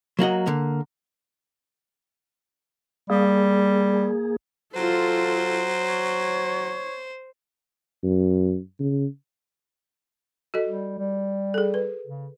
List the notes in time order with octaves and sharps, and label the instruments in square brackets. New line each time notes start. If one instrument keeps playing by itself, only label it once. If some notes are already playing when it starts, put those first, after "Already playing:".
[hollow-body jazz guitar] F#3 A#3 F#4 D#5
D3 A#3
[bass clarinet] G3 [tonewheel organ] A#3 G#4
[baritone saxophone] F#3 [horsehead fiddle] F4 A4 [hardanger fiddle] C5
[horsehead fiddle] C#5
[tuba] F#2
C#3
[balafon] F#4 A4 D#5
[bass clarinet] G3
G3
[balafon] G#4 A4
B4
[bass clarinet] C#3